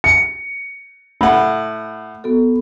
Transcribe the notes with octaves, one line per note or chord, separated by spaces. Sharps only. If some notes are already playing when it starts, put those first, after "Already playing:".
C#7
A2 F#5 B5
B3 F#4 A4